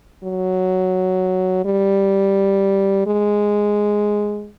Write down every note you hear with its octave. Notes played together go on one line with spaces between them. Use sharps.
F#3
G3
G#3